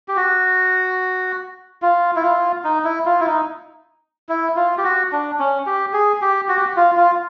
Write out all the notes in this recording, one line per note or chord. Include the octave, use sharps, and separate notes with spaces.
G4
F#4
F4
E4
F4
D#4
E4
F4
E4
D#4
E4
F4
G4
F#4
D4
C#4
G4
G#4
G4
F#4
G4
F#4
F4
F4